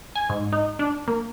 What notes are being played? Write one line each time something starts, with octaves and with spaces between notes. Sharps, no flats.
G#5
G#2
D#4
D4
A#3